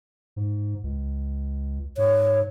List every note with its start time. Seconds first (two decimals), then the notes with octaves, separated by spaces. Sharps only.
0.36 G#2
0.84 C#2
1.98 G#2 C#5